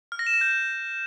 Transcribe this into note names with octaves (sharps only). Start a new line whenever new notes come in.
F6
A#6
E7
A#6
G6